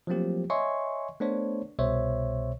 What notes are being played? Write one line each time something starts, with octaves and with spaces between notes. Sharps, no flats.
F3 F#3 A3 A#3 C4 G4
C#5 D#5 E5 G#5 C6 C#6
A3 B3 D4 C5 C#5
C2 B2 C5 C#5 E5